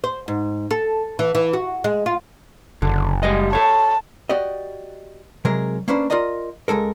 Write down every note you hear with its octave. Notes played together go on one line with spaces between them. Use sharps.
C5
G#2
A4
E3
E3
F#4
G#3
F4
F#1 D3
G3 G#3 D#5
A4 C#5 A5
F#4 G4 D5 D#5
C3 F#3 G#3 A#4
A#3 C#4 D4 B4 C5
F4 A#4 D5 D#5 A#5
C#2 G#3 A4 A#4